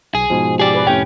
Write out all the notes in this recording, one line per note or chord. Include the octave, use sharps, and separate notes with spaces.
B1 G#4
G#2 B2 F3
G4 G#4 D5
B4
F2 A2 C3 C#4 G5